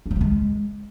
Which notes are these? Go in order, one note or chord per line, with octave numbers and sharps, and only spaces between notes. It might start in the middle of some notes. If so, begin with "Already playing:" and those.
D4
G3
A3
G#3